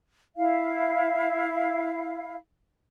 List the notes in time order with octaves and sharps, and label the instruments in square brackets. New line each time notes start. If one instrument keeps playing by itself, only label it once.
[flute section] E4 F5